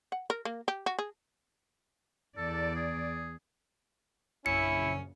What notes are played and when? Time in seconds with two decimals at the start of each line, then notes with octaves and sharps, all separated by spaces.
0.12 F#5
0.30 A#4
0.45 A#3
0.68 G4
0.86 F#4
0.99 G#4
2.37 E2 A4 D5
2.76 G#4
4.46 A#1 F#2 C#3 C#4 E4 C#7